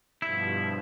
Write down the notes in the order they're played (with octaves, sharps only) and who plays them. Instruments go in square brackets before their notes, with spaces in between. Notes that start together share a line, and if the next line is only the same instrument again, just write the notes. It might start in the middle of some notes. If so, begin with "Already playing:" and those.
[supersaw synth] G2 B2 F3 [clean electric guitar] E4